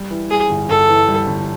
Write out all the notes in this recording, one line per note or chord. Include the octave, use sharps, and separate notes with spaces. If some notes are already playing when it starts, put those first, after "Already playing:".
Already playing: G3
E3
G3 G#4
G1
G1 A4
E3
G3
G1